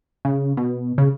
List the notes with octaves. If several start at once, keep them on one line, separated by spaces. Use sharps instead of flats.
C#3
B2
C#3